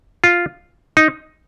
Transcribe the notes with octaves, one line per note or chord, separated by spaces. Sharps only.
F4
D#4